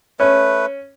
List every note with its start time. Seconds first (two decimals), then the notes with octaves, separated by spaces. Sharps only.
0.20 A3 C#4 B4